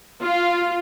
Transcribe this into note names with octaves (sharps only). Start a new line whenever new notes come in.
F4